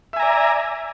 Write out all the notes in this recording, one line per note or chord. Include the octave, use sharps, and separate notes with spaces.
D5 E5 G#5 A#5